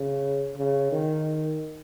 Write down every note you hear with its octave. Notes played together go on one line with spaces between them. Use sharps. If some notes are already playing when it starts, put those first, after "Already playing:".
Already playing: C#3
C#3
D#3